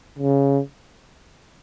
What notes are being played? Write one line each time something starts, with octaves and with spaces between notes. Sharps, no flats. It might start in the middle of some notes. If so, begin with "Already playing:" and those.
C#3